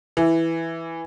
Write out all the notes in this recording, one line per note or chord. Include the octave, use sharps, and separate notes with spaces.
E3